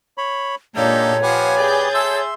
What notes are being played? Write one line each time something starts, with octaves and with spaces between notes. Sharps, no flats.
C#5 B5
A#2 G#3 A#3 D4 D#4 G4 A4 C#5
F3 G4 B4 F5 F#5 G#5
G#4 D5 G6 A6
A4 E5 C6 E6